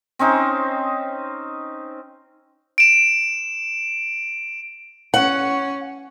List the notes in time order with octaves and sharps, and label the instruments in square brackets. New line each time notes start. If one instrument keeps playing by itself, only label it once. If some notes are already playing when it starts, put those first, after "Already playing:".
[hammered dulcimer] C4 C#4 D#4 C5
[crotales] D7 E7
[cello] C#4 [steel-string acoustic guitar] F#5